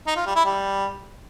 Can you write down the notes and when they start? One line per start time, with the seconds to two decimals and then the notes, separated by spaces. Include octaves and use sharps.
0.07 D#4
0.16 F4
0.26 G3
0.36 E4
0.45 G3